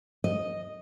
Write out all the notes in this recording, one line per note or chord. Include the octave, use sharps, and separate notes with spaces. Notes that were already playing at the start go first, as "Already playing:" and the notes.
D#5